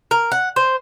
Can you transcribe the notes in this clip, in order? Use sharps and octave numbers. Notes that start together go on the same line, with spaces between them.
A#4
F#5
C5